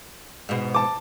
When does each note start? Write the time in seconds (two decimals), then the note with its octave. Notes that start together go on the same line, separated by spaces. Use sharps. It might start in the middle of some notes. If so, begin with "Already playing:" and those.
0.49 G#2 B2
0.74 A5 D6